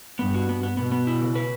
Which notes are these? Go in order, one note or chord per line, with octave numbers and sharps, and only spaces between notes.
G2 B3
F#4
B3
B3
B2 B3
B3
E4
C#3
B4